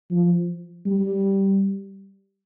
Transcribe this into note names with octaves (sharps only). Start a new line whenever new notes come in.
F3
G3